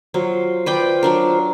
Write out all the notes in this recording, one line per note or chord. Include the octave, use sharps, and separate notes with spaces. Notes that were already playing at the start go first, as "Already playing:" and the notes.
F#3 F4 C5
B4 D5 G5
F#3 D4 A#4